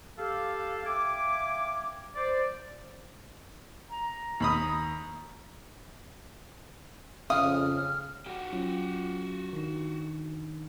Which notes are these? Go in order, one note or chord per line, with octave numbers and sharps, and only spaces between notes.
G4 A4 F5
E5 F5 G5 G#5 D6
C5 D5
A#5
D#2 B5 D#6
F2 C#3 F5 D#6 F6
F#4 G4
F#3 C#4 F4
D#3 D4 D#4